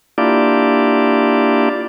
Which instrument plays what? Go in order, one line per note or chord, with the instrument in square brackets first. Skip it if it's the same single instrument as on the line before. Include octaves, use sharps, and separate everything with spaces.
[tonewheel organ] A#3 D4 E4 F4 G4 D5